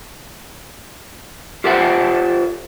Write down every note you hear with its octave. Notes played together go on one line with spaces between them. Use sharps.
F4 G4 A4 C5 E5 F#5